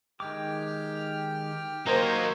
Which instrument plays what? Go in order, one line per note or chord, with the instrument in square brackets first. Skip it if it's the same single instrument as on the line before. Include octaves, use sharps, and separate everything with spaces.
[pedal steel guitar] D#3 G#3 D6 [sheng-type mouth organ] G4 G5 F6
[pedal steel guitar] F#3 C#5 [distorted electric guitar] A#3 D#4 [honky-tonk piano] A#4 C5